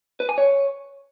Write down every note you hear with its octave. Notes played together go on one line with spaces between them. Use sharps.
B4
G#5
C#5